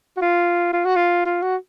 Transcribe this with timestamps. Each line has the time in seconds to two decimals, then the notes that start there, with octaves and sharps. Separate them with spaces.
0.17 F#4
0.21 F4
0.73 F4
0.85 F#4
0.96 F4
1.25 F4
1.42 F#4